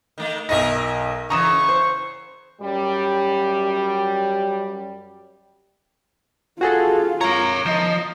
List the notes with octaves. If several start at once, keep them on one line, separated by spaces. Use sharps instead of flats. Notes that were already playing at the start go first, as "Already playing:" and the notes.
D#3 A3
B1 D#4 A#4 D#5 E5 A#6
C#3 E3 A#5 C#6 D#6 E7
C5
F#2 G3
F4 F#4 G#4 A4
A#4 C#5 A#5
F3 D#5